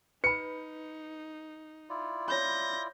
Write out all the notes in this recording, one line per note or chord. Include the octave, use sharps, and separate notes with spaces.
D#4 B4 B5 C#7
E4 F4 D5
C#5 B5 G6 A#6